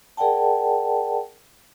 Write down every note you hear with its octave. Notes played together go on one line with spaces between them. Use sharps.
G#4 A#4 D5 F#5 G5 A5